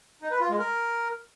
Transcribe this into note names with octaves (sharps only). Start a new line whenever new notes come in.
D#4
B4
F4
G#3
A#4